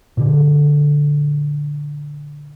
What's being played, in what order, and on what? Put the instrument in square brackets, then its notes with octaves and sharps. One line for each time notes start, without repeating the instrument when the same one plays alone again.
[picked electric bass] A#2 D3